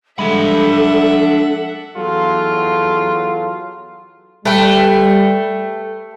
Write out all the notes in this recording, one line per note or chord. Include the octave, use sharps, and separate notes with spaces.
F3 G3 G#3 D4 A4 E5 F#5 B5
E2 F#3 F4 A4
G3 A3 B4 G5